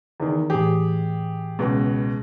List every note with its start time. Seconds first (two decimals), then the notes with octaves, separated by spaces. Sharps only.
0.20 E2 D#3
0.50 A2 E3 G4 G#4
1.59 C#2 B2